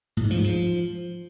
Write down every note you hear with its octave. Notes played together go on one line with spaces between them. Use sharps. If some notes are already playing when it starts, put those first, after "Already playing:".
A2
G#2
F3
G#2
F3